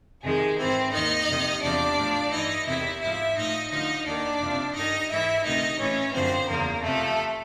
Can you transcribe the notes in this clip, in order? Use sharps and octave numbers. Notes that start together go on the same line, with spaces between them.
F2 C3 D#3 G#3 G#4
G#2 E3 C4 C5
D#2 D#3 D#4 D#5
F2 C3 D#3
E2 C3 F3 D4 D5
A2 F3
G2 E3 D#4 D#5
E2 C3 D#3 E4 E5
G#2 F3 E4 E5
A2 F3 D#4 D#5
D2 D3 F3 D#4 D#5
D#2 D#3 D4 D5
F2 C3 F3
G2 D#3 D#4 D#5
G#2 E3 E4 E5
D2 C3 D#3 D#4 D#5
A2 E3 C#4 C#5
F#2 D3 F3 C4 C5
E2 C#3 F3 A#3 A#4
F2 C3 F3 A3 A4